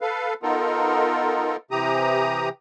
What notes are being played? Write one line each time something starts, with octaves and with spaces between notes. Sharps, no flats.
A4 B4 F5
B3 D#4 F4 A4 A#4
C3 E3 G4 A#5 D#6